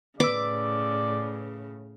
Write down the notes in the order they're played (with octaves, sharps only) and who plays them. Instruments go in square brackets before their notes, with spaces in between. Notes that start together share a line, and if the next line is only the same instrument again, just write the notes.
[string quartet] A2 C#3 [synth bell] B4 E6 [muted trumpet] D5 [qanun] D6